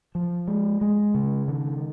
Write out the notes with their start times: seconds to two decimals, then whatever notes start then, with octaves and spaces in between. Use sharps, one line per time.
0.15 F3
0.48 G#3
0.81 G#3
1.14 C#3
1.48 D#3